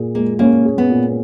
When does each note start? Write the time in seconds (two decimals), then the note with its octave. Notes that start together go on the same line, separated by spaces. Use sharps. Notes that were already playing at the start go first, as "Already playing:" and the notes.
Already playing: A#2 G#4
0.15 G#3 A#3
0.39 A#3 C#4
0.65 G#4
0.78 B3
0.90 A#2